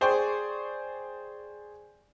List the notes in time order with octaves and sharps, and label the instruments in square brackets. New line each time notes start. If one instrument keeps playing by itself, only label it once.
[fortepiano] G#4 C5 D5 G5 C#6